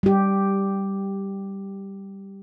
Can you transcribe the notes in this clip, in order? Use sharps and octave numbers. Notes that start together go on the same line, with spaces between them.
G3 G4